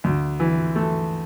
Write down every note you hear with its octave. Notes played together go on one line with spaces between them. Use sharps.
D2
E3
A3